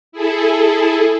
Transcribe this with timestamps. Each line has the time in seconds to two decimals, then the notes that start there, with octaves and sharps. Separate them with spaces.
0.12 E4 G#4 A4